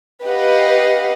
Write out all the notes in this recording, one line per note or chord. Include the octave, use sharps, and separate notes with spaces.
G4 B4 D#5 F5 F#5